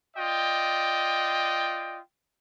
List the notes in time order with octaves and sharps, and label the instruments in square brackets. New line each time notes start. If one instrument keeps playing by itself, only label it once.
[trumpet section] F4 D5 D#5 G5